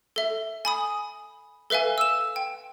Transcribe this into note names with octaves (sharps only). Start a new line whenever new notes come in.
A4 E5
G#5 B5 D#6
A4 B4 E5 F5 G#5
E6 E7
G5